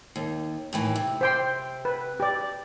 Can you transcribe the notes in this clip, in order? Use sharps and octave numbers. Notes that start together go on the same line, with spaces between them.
D#2
D#2 A2 E3
C3
C5 G5 C6
B4
G4 D5